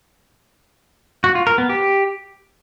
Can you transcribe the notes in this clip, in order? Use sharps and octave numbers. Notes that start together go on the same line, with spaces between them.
F#4
F4
A#4
B3
G4